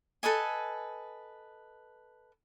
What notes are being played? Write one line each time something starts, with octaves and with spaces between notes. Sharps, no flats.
A4 B4 D#5 G#5